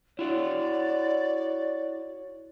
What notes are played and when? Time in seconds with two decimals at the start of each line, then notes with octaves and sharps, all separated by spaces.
0.19 E4 F#4 C#5 D5